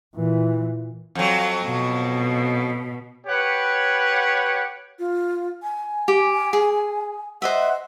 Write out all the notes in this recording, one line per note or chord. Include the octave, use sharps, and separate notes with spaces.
A#2 E3
F2 F#3
B2
G4 B4 C#5 F#5
F4
G#5
G4
G#4
C5 D#5 E5 F#5